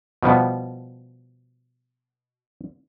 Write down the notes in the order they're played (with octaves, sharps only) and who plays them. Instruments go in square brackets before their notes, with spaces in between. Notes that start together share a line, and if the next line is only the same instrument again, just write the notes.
[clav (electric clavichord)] B2 F3 G3 B3